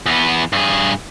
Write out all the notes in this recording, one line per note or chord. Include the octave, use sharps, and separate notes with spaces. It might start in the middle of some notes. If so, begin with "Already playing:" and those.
E2 B3
G2 G#4